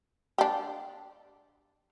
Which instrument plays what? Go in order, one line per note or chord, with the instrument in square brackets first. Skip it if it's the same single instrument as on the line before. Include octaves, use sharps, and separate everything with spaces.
[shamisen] D4 G4